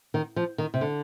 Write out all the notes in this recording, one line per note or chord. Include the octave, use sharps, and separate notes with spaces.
D#3
F3
D#3
C3
D3